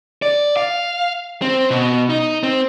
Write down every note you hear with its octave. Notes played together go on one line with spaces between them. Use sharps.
D5
F5
C4
B2
D#4
C4